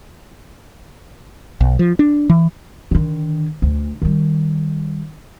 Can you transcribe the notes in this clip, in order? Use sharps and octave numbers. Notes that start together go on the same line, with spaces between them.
B1
F3
D4
E3
D3 D#3
D2
D#3 G3